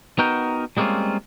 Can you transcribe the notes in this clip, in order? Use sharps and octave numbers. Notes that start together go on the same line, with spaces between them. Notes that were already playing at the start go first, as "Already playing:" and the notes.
B3 D#4 F#4 A#4 G5
G3 G#3 A#3 C4 C#4 F4